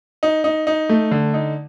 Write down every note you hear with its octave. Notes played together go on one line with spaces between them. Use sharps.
D#4
D#4
D#4
A3
D3
D#4